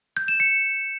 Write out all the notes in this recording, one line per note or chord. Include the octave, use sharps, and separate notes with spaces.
G6
E7
C#7